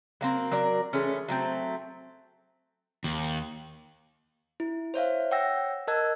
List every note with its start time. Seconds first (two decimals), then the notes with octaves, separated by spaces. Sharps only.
0.21 F#3 A#3 C4
0.52 F#3 A#4 D5
0.93 E3 G#3 A3 C#4
1.28 F#3 A3 C4
3.04 D#2
4.60 E4
4.94 C5 C#5 E5 F5
5.31 C#5 F#5 G5 E6 A#6
5.88 A#4 D#5 A5 E6 F#6 G#6